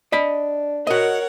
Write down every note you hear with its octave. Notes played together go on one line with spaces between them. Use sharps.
D4 D#5 B5
F#4 A#4 C#5 D#5 F#5